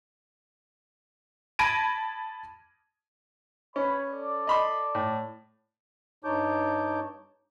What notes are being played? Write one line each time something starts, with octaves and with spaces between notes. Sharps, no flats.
A5 B5 G#6 A#6 D7 D#7
C#4 B4 C#5 B5
A4 D5
D#5 B5 C6
A2
G2 D#4 C#5 A5 D6 G6